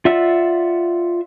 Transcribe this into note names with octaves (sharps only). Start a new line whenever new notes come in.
F4 D5 E5 F#5 E6